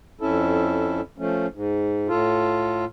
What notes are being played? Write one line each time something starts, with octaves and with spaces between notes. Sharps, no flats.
F2 C#4 E4 A4
F3 A3 C#4
G#2
A2 F4 A4